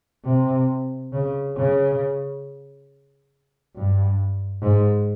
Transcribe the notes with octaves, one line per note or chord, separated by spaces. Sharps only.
C3
C#3
C#3
G2
G#2